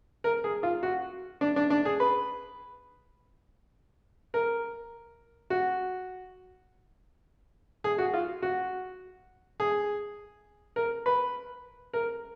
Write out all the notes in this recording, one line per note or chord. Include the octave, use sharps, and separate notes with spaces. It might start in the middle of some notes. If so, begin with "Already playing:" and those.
A#4
G#4
F4
F#4
D4
D4
D4
G#4
B4
A#4
F#4
G#4
F#4
F4
F#4
G#4
A#4
B4
A#4